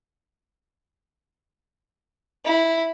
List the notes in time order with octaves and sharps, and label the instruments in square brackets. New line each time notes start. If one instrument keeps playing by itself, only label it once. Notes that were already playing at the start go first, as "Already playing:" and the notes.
[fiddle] E4